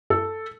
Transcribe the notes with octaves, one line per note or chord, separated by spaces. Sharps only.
A4